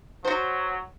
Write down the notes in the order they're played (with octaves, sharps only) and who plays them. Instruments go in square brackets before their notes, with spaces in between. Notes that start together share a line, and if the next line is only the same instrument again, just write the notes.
[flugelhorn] F#3 [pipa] F#4 C5